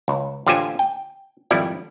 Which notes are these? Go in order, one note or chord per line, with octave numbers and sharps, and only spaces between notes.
C#2
A1 D3 F4 G4 C5 G#5
G5
G#1 F2 G3 E4 D5